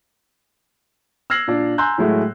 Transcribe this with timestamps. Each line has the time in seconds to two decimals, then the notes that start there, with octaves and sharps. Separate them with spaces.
1.30 E6 F6 G#6 A#6 C7 F#7
1.48 A#2 D4
1.78 G#5 A#5 C6 E6 F#6 G6
1.98 A2 F#3 G#3 A3